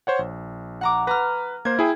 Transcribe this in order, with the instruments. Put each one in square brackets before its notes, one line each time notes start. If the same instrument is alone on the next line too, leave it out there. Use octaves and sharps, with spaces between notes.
[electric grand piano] C5 C#5 F#5
A#1
[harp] F#5 A#5 D6
[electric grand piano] B4 [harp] A#5 F6
[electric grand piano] A#3 C5 [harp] G#6
[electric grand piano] E4 G#4 G5